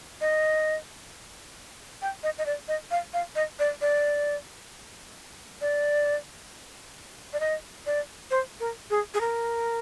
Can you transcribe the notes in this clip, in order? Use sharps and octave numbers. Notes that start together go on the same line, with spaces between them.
D#5
G5
D#5
D#5
D5
D#5
F5
F5
D#5
D5
D5
D5
D5
D#5
D5
C5
A#4
G#4
G#4
A#4